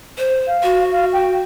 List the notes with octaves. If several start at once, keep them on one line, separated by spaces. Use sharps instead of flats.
C5
F5
F#4
F5
G5